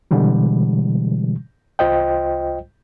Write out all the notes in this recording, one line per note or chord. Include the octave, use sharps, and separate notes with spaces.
B2 D3 E3 G3 G#3
C2 F4 C5 D#5 G5